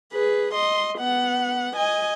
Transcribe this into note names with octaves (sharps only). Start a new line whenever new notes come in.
G#4 B4
D#5 C6
B3 F#5
D#5 G#5